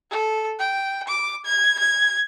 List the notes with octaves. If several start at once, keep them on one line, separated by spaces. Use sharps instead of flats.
A4
G5
D6
G#6
G#6